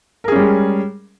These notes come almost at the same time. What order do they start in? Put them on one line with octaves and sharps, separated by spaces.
A#4 G#4 C#4 G3 G#3